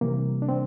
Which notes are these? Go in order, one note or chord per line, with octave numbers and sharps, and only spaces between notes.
C3 E3 G3 A#3
D4
C4